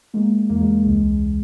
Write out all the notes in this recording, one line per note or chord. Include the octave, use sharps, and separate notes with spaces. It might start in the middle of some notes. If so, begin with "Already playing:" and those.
G#3 A#3
E2 A#3
G#3
C#2 G#3